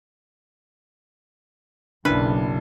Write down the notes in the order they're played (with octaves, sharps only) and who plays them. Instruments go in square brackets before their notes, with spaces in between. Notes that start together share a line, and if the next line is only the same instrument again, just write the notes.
[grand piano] F#1 [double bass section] B1 F#2 C#3 [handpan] D4 E4 [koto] B4